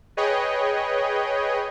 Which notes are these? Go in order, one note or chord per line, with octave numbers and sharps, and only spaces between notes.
G#4 B4 C#5 D#5 G5